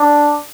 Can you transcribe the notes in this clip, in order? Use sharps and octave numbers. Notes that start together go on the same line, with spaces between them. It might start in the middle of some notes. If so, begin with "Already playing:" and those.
Already playing: D4